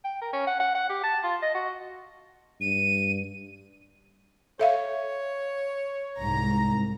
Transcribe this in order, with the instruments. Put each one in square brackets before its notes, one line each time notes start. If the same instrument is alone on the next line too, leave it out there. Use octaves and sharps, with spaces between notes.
[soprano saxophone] G5
A#4
C#4
F#5
F#5
F#5
G4
A5
F4
D#5
F#4
[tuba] G2 [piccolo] D#7
[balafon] A4 E5 F5 [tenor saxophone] C#5
[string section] C2 G#2 A#5